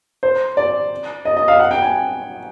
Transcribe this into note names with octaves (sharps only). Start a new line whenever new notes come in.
C5
D5
D#5
D#5
F5
F#5
G5
G#5